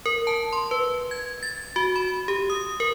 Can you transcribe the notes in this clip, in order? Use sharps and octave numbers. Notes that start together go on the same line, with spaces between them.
A#4
A5
C6
B4
G#6
A6
F#4
B5
G4
D#6
A#4